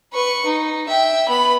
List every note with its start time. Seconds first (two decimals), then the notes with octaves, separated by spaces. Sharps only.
0.13 B4 C#6
0.45 D#4
0.88 E5 G5
1.28 B3 B5